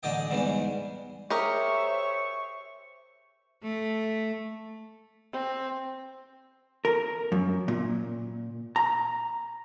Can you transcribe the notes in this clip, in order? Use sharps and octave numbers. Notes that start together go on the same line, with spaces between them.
A1 D3 F#3 D5 D#5 G5
E2 G#2 E3 G3
G4 G#4 A#4 C5 C#5 E5 C#6
A3
C4
A#4
F#2
A#2
A#5